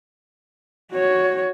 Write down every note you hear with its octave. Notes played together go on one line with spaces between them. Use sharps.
F#4 C#5